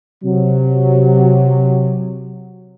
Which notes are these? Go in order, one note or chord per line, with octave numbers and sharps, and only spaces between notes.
C3 F#3